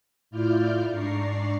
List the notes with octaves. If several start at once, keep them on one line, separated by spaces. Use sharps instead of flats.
A2 E4 F4 D5 F6 G6
G#2 D4 D5 A#5 C#6 C7